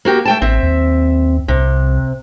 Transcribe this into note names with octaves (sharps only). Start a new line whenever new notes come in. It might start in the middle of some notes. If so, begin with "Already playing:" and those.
A#3 F#4 G4
A3 G5 A5
A1 C4 E5
D#2
C2 C3